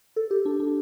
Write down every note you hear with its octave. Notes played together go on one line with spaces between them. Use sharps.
A4
G4
D4
D4